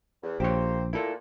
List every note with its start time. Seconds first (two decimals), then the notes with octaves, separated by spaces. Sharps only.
0.23 E2
0.40 A#1 A#3 C4 G4 C5 C#5
0.93 A#2 E4 A4